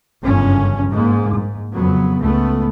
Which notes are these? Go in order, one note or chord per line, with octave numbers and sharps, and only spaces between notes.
G1 F#2 C#3 E3 C#4
G#2 G#3 A#3
G#2
F2 C#3 F#3 B3
C#2 A3 B3